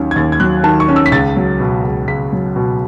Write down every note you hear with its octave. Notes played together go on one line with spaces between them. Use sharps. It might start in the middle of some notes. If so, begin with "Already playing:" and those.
Already playing: D#2 D#3 F#3 C#4
G#6
D#2 A6
G#6
F#3 F#6
D#3 A5
C#6
C#4
E6
B6
C#2 A6
F#3
B2
C#2
C#2 B6
F#3
B2